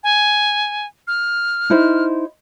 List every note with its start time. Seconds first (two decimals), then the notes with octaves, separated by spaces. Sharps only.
0.04 G#5
1.07 F6
1.70 D#4 E4 C5